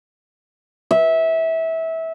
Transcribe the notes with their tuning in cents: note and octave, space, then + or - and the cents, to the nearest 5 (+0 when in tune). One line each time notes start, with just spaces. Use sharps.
E5 -20